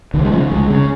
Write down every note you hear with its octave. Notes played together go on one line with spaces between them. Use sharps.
C#2 D#3
G#3
C#3 F3
C#2 G#3
C#3